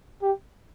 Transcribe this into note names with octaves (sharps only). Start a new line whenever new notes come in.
G4